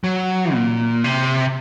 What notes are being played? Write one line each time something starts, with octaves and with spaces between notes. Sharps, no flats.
F#3
A#2
C3